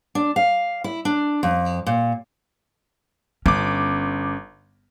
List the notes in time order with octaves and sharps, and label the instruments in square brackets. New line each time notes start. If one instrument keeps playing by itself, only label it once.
[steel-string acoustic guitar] D4
F5
E4
D4
F2
A#2
[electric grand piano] G1 D6 [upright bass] C#4